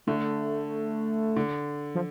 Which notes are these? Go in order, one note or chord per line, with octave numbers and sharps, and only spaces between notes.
D3 A3
D3
F3